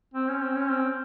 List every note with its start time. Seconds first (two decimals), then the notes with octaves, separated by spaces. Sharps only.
0.14 C4
0.29 C#4
0.42 C4
0.56 C#4
0.70 C4